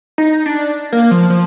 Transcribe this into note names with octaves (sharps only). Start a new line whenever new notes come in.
D#4
D4
A#3
F3
F3